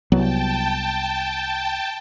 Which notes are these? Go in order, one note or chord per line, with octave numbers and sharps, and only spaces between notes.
C2 F#3 B3 G5 A5